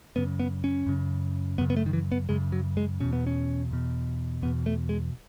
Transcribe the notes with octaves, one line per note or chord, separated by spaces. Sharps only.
F#2 C#3 B3
B3
C#4
F#2 C#3
F#2 C#3 B3
B3
A3
D#3
E3
B3
F#2 C#3 G#3
F#3
G#3
E2 B2 C#4
B3
C#4
E2 B2
E2 B2 B3
A3
G#3